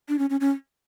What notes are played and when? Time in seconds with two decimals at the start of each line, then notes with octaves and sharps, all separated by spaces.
0.09 D4
0.19 C#4
0.30 C#4
0.41 C#4